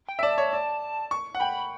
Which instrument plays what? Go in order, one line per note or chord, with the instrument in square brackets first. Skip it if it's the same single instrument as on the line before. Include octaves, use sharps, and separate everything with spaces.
[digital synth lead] G5
[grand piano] E5
[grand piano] D5 [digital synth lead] A5
[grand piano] C#5
D5
C#6
F#5
[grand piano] G5 [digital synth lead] B5